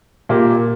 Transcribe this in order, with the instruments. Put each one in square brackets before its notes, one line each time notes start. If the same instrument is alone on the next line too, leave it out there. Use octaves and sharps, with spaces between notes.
[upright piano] A#2 A#3 G4